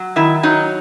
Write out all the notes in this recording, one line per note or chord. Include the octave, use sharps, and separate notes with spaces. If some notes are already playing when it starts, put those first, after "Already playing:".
Already playing: F#3
D#3 E4
F#3 D#4